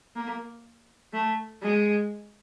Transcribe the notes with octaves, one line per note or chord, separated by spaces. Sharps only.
A#3
A3
G#3